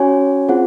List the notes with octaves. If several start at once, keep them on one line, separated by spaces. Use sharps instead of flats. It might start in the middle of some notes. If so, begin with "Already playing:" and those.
Already playing: C#4 F#4 C#5 G#5
C4 F4 G#4 C5 F#5